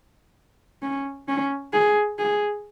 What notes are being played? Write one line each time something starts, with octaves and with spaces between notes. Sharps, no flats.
C#4
C#4
G#4
G#4